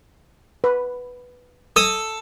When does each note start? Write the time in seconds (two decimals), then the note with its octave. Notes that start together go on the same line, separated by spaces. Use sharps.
0.64 B4
1.76 A4 D#6